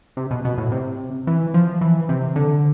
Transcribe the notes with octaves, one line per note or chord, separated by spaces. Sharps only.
C3
B2
B2
A2
C3
E3
F3
E3
C3
D3